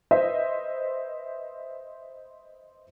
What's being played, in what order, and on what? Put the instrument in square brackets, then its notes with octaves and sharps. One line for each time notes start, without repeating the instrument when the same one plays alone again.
[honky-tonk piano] B4 C5 D#5 E5